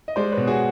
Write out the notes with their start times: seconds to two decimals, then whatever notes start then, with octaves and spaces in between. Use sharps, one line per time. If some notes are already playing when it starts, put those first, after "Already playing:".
0.08 D#5
0.16 G#3 C5 D5
0.32 B4 C#5
0.37 B2
0.47 F#4 G#4